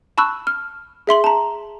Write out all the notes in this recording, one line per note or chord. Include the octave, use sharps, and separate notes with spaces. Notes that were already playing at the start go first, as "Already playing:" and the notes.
A5 B5 C#6 E6 F#6
F6
G#4 E5 C6 F#7
A5 A#5